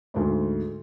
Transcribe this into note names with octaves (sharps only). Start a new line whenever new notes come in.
D2 G#2